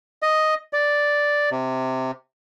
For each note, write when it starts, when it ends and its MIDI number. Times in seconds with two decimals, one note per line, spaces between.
0.23 0.54 75
0.73 1.49 74
1.51 2.11 48